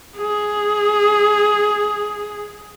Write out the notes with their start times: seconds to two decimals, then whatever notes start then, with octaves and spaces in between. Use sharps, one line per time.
0.17 G#4